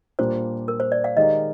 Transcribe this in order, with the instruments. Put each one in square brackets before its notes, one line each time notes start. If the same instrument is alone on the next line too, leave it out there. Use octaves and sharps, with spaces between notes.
[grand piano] A#2 G3 A#3 D4 F4 [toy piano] C5
[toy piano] A#4
C5
D5
F5
[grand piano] D#3 G#3 D#4 G4 A#4 [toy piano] D#5